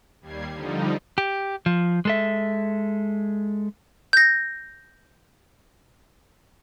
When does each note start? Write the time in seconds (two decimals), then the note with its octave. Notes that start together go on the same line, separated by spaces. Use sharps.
0.21 D#2 G3 G#6 C7
0.54 D3 F3 G3 D#4
1.18 G4
1.66 F3
2.05 G#3 A4 E5
4.13 G6 A#6